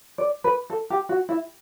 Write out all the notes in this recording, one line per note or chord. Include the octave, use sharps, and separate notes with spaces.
D5
B4
A4
G4
F#4
E4